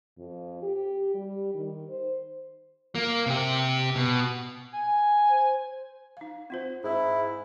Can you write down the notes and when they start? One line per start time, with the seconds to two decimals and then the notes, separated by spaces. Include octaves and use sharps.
0.18 F2
0.63 G4
1.14 G3
1.55 D#3
1.89 C5
2.95 A#3
3.26 C3 G4
3.95 B2
4.73 G#5
5.30 C5
6.17 D#4 F5
6.50 C4 F4 C5
6.84 G#2 E4